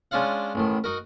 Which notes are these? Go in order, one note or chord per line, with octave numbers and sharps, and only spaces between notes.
G#3 C#4 D4 F4 F5 F#5
A1 A2 D#3
D#4 F#4 A#4